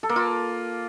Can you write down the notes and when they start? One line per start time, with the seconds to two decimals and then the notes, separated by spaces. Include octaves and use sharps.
0.03 A4
0.09 A#3
0.16 F4